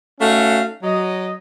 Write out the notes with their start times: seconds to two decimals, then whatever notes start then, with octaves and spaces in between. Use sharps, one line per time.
0.20 A3 C#4 D#4 F#4 F5
0.83 F#3 D#5